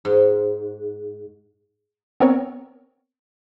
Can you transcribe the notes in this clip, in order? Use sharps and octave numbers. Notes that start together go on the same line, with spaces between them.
G#2
B3 C4 A#4 C#5